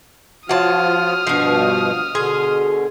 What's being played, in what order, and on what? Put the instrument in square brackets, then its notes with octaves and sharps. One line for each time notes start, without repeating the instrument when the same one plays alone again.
[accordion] F3 F4 [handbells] F#4 C#5 [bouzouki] F#5 A5 [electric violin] D#6 F6
[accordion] G2 B2 [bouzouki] F3 F#4 [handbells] C7
[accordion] B2 D3 [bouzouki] G#4 [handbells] C6